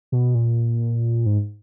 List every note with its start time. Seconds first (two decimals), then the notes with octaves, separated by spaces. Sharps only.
0.12 B2
0.35 A#2
1.26 G#2